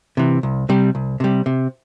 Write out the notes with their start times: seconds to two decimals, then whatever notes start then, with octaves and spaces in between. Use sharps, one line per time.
0.17 C3 E3
0.43 C2
0.69 C3 G3
0.95 C2
1.20 C3 G3
1.46 C3